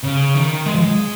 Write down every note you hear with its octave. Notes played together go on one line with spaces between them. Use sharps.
C#3
D#3
G#3
F3
G#3